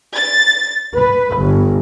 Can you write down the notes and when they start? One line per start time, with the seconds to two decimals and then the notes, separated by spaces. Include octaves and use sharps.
0.15 A6
0.96 B4
1.37 G1